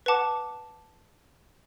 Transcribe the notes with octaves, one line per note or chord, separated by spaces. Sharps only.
B4 F#5 A5 D6